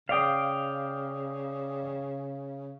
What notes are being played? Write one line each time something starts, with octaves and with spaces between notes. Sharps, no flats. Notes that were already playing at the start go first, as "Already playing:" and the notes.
C#3 D5 F5 G5 D6 D#6